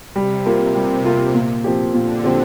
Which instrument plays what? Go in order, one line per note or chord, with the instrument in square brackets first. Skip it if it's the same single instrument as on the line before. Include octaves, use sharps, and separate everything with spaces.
[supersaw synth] C3 [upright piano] G3
[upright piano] A#3 F4
[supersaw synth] C3 [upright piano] G3
[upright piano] A#3 F4
A#2
F3 C4 G4
[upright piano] A#2 [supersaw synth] D3
[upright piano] F3 C4 G4